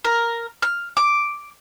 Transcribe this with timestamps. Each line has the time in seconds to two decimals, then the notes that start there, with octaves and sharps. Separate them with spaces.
0.05 A#4
0.62 F6
0.97 D6